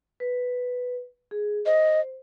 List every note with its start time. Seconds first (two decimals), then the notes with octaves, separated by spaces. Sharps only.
0.20 B4
1.31 G#4
1.66 C5 D#5